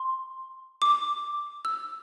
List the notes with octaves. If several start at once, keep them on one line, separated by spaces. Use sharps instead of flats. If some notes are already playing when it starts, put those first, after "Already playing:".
Already playing: C6
D6
E6